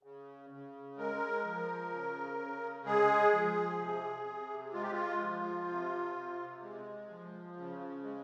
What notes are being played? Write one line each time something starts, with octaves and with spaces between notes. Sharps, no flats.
C#3
C#3
G#3 A#4
F3
C#3
C#3
G#3 G#4
F3
C3
C3
G#3 F4
G4
F4
F3
C3
C3
G#3
F3
C#3
G#3